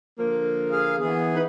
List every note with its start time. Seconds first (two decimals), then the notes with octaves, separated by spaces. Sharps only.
0.19 D3 F3 A#3
0.71 G#4 F5
0.98 E3 B3 G#4
1.35 D#4 B4